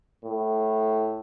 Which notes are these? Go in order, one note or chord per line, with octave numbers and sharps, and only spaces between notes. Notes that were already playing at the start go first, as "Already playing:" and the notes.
A2